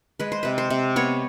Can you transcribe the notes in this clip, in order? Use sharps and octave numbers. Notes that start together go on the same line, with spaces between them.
G#3 B4
C5
C3 B4
C5
C3
B3 C#5